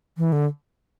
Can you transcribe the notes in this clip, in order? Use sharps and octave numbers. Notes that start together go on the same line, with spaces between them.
E3
D3